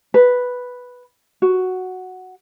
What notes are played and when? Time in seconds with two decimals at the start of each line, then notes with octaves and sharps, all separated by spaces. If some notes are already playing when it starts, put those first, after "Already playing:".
0.14 B4
1.42 F#4